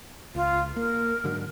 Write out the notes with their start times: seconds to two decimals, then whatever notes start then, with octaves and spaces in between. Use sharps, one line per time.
0.35 C#2 F4
0.76 A#3 A#4
1.24 G#2 D3 F#3